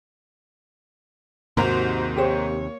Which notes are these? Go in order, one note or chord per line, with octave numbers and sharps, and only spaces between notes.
D#2 G#2 C3 F#4 A#4 C5 A#5
A#3 G4 G#4 C5 C#5